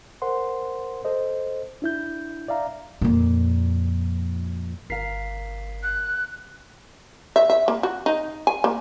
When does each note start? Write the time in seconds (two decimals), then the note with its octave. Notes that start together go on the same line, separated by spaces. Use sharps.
0.22 A#4 C5 F#5 C6
1.05 A4 C5 D#5
1.82 D4 E4 G6
2.48 D5 E5 F5 A#5
3.01 F2 A#2
4.90 G1 A#4 F5 B6 C7
5.83 F#6
7.36 E5
7.50 E5
7.68 A#3
7.83 F#4
8.06 D#4
8.47 G#5
8.64 A#3